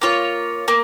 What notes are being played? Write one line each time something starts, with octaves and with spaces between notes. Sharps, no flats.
A#3 F4 C#5
A#3